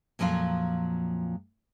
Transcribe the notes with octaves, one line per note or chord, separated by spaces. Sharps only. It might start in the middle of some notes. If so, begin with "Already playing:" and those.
F2 A#2 F3 F#3 F4